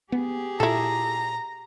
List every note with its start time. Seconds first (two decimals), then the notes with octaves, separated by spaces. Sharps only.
0.12 B3 G4 G#4
0.60 A#2 E4 A4 A#5